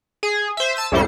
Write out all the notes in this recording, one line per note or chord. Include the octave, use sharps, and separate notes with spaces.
G#4
C5 E5
A5 E6 D#7
C#2 F#2 A2 G3 C5 C#7